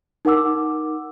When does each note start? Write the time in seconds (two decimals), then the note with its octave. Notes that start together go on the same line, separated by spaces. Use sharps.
0.25 D#4 A#4 F#5 D6 E6